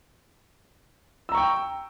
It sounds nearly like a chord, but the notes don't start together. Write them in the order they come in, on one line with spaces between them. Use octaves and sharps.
E6 A#5 C#6 G5